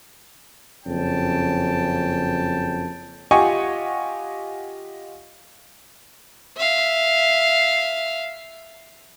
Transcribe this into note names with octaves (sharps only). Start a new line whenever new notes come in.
F#1 F2 C#4 G5 A5
F4 G4 D#5 F#5 G#5 C#6
E5 F5